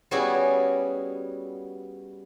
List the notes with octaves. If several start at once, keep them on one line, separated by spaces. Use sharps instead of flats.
G3 B3 C#4 E4 F#4 G#4